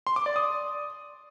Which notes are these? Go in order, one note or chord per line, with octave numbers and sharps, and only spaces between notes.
C6
D6
D5
D#6